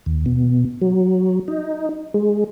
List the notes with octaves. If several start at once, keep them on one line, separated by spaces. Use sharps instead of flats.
D#2
B2
F#3
D#4
G#3